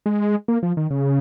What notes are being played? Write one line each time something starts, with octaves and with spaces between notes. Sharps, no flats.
G#3
A#3
F3
D#3
C#3